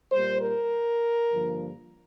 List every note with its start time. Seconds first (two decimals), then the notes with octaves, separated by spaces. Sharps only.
0.12 A#2 G3 A#3 C5
0.42 A#4
1.30 G2 D3 F3 A#3